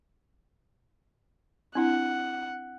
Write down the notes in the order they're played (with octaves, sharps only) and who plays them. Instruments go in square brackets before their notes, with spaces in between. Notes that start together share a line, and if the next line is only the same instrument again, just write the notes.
[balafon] C4 D4 E4 [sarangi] F#5